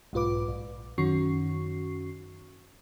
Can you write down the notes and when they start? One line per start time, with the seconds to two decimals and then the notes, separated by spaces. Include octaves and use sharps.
0.13 B1 G#2 F4 B4 D6
0.48 A#1
0.98 F#2 D#3 C#4 F#4 C#6 C7